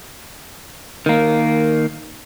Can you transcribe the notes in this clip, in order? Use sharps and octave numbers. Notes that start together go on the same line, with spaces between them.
D#3 A#3